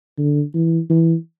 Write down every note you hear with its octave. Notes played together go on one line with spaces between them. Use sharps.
D3
E3
E3